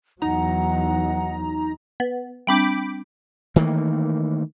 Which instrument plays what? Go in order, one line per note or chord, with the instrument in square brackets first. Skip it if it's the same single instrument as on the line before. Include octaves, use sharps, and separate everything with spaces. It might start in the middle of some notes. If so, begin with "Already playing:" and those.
[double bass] E2 F#3 [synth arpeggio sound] D#4 A#5 [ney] F#5
[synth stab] B3
[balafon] G3 C4 D4 [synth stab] G5 B5 D6
[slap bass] D#3 E3 A3 A#3